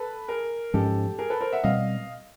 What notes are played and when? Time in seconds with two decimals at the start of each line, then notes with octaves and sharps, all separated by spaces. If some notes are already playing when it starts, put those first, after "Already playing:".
Already playing: A4 B4
0.28 G#4 A#4
0.73 G#2 F3 G#3 C#4 G4 A4
1.19 G#4 A#4
1.30 A4 B4
1.41 A#4 C5
1.52 E5 F#5
1.64 B2 G3 C4 D#5 F5